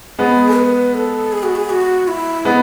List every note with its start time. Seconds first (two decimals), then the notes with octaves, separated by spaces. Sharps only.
0.19 G#3 B3 G#4
0.57 B4
0.94 A4
1.32 G#4
1.43 F#4
1.55 G#4
1.70 F#4
2.08 E4
2.45 G#3 B3